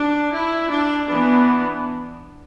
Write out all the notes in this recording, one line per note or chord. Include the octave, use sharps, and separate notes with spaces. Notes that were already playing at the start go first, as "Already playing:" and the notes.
Already playing: D4
E4
D4
E3 B3 D4